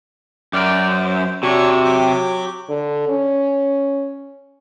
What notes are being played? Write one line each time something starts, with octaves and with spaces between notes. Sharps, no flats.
F#2 D5 G5 D6 F6 D7
C5
C3 D4 F#4 C#5 C#6
F#3 G4 D6
D3
C#4